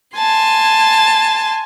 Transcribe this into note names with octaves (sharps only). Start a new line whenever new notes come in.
G#5 A5 C6